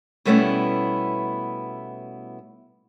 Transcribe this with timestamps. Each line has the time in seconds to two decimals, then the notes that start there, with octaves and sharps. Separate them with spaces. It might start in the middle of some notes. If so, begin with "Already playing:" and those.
0.25 B2 G3 A3 B3 C#4 E4